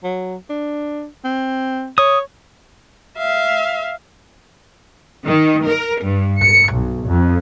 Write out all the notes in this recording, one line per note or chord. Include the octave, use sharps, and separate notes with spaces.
F#3
D4
C4
C#5 D#6
E5 F5
D#3
A#4
G2
C#7
B1
F2